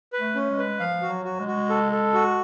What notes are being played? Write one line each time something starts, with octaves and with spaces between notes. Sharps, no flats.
B4
A3
C#4
G#3
B4
F3 F5
F#4
F#3
F#4
G#3
F#4
A4
A4
F#4